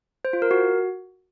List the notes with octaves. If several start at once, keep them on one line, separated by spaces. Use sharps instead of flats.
C5
F4
A#4
F#4